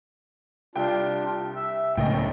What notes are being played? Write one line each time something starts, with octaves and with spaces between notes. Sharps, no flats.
C2 D4 F4 G5
E5
C#2 A2 C#4 D#5 G5